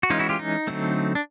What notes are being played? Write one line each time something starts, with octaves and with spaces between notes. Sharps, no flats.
F#4
E3 G#3 C#4 D#4 F4
E4 F#4
F4 G4
D#4
D3 F#3 A3 C4
D4